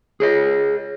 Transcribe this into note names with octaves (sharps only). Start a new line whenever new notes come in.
G#4 C#5 D#5